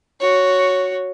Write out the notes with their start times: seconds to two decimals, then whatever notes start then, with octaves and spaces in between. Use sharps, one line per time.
0.20 F#4 C#5